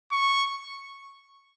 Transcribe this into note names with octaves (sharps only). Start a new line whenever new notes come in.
C#6